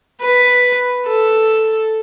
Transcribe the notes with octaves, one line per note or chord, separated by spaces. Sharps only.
B4
A4